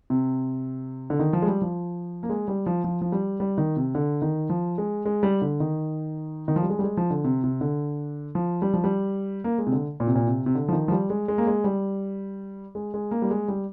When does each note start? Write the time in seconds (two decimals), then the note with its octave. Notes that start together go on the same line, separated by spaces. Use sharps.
0.10 C3
1.10 D3
1.19 D#3
1.33 F3
1.42 G#3
1.47 G3
1.62 F3
2.23 A#3
2.29 G#3
2.48 G3
2.66 F3
2.84 F3
3.01 F3
3.12 G3
3.40 G3
3.58 D#3
3.76 C3
3.95 D3
4.22 D#3
4.50 F3
4.78 G#3
5.05 G#3
5.23 G3
5.42 D3
5.60 D#3
6.48 D#3
6.56 F3
6.62 G3
6.70 G#3
6.79 G3
6.83 G#3
6.97 F3
7.11 D3
7.24 C3
7.44 C3
7.61 D3
8.35 F3
8.62 G3
8.74 F3
8.84 G3
9.44 A#3
9.58 G#3
9.67 C3
9.72 D3
10.00 A#2
10.07 C3
10.15 A#2
10.27 C3
10.46 C3
10.55 D3
10.68 F3
10.73 D#3
10.88 F3
10.91 G3
11.10 G#3
11.28 G#3
11.38 A#3
11.47 G#3
11.64 G3
12.75 G#3
12.94 G#3
13.11 A#3
13.22 G3
13.31 G#3
13.48 G3